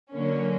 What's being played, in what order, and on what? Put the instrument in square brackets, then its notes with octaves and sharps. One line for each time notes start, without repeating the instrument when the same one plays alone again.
[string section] D3 F#3 A#3 C#4